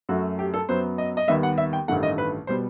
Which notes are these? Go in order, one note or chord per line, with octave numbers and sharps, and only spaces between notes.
F#2 F#3 A3 F#4
G4
A4
F#2 F#3 B3 C5
D#5
D#5
D#2 D#3 G3 B3 E5
F#5
E5
G5
A1 G2 D#3 A3 F#5
D#5
B4
B2 G3 B3 C5